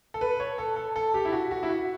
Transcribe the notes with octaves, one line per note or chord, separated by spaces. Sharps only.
A4
B4
C#5
A4
A4
A4
G4
E4
F#4
F#4
E4
F#4